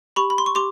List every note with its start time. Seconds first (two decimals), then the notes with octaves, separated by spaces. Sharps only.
0.16 G4 B5 C#6
0.30 B5
0.38 C6
0.46 C#6
0.55 G4 C6 D6